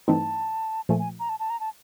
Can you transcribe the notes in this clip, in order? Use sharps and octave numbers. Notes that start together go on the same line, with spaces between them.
G2 E3 A3 C4 D#4 A5
A#2 F3 A3 G#5
G#5
A#5
A5
A5
A#5
A5